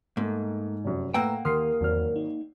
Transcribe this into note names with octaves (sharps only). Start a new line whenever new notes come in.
G#2 A3 A#3
F1 F#2
A2 A#3 B4 F#5 G5 A#5 E6
D#2 A#4 C6 D#6 F6 C7
G#1 E2 F#3 F6
D#4